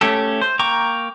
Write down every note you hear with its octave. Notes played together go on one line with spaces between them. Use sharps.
A3 C#4 G4 A4
C5
A#3 G5 A#5 C#6 D6